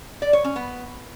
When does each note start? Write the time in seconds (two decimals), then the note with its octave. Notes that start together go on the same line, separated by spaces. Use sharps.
0.22 D5
0.33 C#5
0.44 C#4
0.56 B3